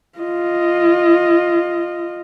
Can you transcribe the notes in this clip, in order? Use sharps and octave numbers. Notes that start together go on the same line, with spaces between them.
F4 D#5